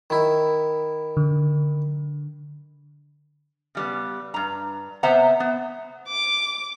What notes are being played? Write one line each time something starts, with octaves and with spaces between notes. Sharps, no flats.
D#3 E4
D3
C#3 G3 B3
G2 A#5
C3 B3 C5 E5 F#5 A#5
B3
D6